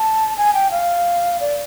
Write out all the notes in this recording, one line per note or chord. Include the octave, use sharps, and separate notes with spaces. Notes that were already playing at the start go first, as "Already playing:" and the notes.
Already playing: A5
G#5
G5
F5
D5